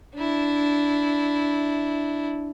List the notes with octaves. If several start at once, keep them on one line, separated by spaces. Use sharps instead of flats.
D4 E4